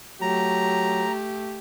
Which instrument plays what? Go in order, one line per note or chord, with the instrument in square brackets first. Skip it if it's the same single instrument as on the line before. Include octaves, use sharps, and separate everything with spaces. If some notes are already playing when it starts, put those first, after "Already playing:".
[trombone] F#3 [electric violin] A3 G4 [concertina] A#5